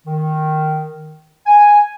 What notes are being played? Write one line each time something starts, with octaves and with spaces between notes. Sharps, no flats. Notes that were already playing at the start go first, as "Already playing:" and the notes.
D#3
G#5